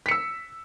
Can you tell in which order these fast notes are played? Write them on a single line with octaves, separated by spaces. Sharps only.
B6 C#7 E6